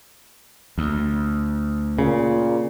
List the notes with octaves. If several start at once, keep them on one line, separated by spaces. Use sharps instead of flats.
D2
A#2 C#3